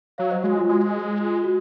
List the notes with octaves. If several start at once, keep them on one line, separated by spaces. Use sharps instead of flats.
F#3 C#5 F5
C5 D#5
G#3 F#4
F4
G#3 F#4
F4
F#4